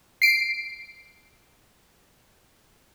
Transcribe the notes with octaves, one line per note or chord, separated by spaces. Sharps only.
C7 D7